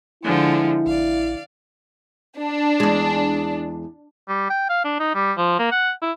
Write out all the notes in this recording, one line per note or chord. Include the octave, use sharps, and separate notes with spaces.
D3 F3 G#3 E4
A1 D5 F5
D4
E2 G#3
G3
G5
F5
D4
D#4
G3
F3
A#3
F#5
E4